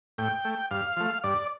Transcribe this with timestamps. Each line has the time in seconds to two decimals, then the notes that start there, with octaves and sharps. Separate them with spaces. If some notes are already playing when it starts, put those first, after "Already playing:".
0.18 A2 G5
0.45 A3
0.71 G2 F5
0.97 F3 A3
1.24 G2 D5